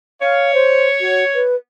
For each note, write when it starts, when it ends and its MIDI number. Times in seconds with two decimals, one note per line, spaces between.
0.21 1.44 73
0.21 0.52 77
0.54 0.88 72
1.00 1.24 66
1.34 1.55 71